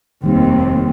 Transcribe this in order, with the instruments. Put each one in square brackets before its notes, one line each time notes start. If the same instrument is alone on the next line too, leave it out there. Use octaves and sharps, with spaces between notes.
[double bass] F1 C4 [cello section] D#2 [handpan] D#3 G3 D#4